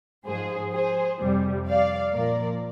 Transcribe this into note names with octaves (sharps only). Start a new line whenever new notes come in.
G#2 F3 G#4 C5
G#4 C5
F2 C3 G3
D5 F5
A#2 F3 A#4 D5